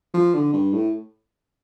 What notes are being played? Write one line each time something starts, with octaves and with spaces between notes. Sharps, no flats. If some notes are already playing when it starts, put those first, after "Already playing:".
F3
D3
G2
A2